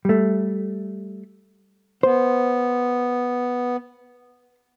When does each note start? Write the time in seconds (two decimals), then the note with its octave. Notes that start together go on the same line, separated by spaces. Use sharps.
0.05 G3 A3
2.03 B3 C5